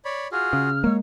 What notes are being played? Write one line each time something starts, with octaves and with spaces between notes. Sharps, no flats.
C#5 D5 B5
F4 F#4 G#4 F6
C#3
G#3 A#3 C#5